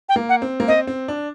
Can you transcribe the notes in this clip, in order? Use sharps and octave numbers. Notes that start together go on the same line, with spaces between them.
G5
A#3
F#5
C4
A#3
C4 D#5
C4
D4